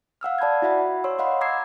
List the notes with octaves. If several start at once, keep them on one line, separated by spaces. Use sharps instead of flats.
F5 F#5 E6 F6
D5 A5 B5 G6 G#6
E4 F#4 E5 F#5 B5
C#5 C6 E6
D#5 F5 F#5 B5 C6
A#5 D6 E6 G#6 C7